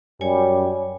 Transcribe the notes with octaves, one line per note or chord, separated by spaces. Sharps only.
F#2 G3 C#5 G#5